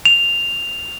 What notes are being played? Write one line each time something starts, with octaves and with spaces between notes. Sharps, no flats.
F7